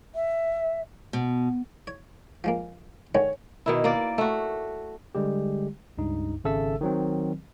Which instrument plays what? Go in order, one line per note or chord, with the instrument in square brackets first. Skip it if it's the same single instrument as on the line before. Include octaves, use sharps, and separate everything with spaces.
[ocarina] E5
[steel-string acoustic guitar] B2
[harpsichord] C#5
F3 G#3 A#3
[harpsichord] D3 D#3 G#3 [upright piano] C#5
[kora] B2 D#3 E4
A#3 D5
A3 F#4
[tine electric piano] D3 G3 G#3 G4
C#2 G2 D#4
G#1 C#3 A4 E5 E6
D#3 F#3 C4